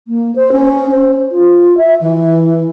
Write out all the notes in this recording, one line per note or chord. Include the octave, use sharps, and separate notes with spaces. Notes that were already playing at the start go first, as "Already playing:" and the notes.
A#3
C5
C#4
C5
F4
E5
E3